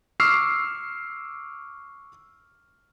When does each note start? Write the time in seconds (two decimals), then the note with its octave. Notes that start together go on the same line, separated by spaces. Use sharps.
0.20 C#6 D6 E6 F6 C7